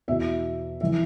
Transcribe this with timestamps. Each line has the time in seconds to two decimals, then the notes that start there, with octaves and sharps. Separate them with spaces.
0.08 E2 B2 E5
0.81 E3 E5